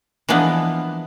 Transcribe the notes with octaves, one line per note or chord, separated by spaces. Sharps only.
E3 F3 G#3 A#3 B3 D4